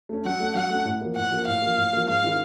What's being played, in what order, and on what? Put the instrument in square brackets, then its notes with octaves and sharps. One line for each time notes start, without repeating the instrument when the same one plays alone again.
[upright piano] A3 C#4
[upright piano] F#3 [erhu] F#5
[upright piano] A3 C#4
[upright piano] F#3 [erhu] F#5
[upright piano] A3 C#4
A2
F3 A#3
[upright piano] A2 [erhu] F#5
[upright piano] F3 A#3
[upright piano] A2 [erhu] F5
[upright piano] F3 A#3
A2
F3 A#3
[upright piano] G#2 [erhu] F5
[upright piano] D#3 G#3 C#4 E4